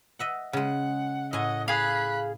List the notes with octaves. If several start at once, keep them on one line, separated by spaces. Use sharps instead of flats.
D#5 E5 F#5
C#3 G#3 F#5
A2 D#5 F#5 G#5
G#4 F5 B5 F#6